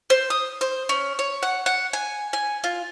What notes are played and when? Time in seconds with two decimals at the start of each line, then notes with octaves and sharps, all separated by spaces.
0.10 C5
0.30 D#6
0.61 C5
0.89 C#4
1.19 C#5
1.43 F#5
1.66 F#5
1.93 G#5
2.33 G#5
2.64 F4